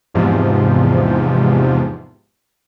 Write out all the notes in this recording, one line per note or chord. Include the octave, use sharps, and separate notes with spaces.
E2 G#2 C3 F3